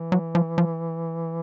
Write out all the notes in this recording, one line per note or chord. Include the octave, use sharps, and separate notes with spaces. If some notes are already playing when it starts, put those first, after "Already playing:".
Already playing: E3
F#3
F3
F3